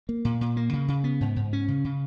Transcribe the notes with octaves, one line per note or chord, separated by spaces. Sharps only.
A#3
A#2
A#2
A#3
C#3
C#3
B3
G#2
G#2
C#4
C#3
C#3